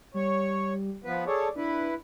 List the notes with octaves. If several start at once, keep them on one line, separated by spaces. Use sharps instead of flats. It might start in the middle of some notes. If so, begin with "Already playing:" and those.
G3 C#5
F3 B3 B4
G#4 A4 C#5 D5
D4 E4 B4